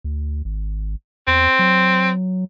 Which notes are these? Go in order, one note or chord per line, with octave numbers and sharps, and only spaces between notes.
D2
G#1
E2 C4
F#3